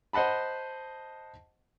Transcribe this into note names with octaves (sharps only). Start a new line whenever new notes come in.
C5 D#5 F#5 A5 B5